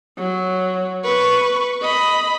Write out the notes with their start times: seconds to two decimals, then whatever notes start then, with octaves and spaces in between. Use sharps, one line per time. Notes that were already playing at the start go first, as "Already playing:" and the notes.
0.18 F#3
1.04 B4 C#6
1.81 D#5 B5